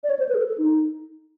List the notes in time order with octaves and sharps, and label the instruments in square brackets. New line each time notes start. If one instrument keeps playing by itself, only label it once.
[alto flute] D5
C#5
C5
B4
G#4
A4
A4
D#4